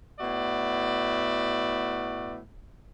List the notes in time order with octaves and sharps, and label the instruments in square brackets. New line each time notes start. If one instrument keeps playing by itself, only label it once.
[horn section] A2 B3 F#4 D5 E5